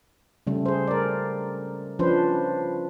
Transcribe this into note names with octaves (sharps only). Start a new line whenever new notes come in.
C#3 G3 A3
G#4 C5
A#4 D5
F3 C#4 D4 B4 C5